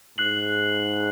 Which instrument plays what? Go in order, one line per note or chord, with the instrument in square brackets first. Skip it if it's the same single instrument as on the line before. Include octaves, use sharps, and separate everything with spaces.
[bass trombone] G#2 [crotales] F#6 C7 F#7